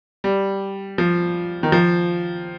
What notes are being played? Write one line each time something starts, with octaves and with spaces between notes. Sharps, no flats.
G3
F3
D#3
F3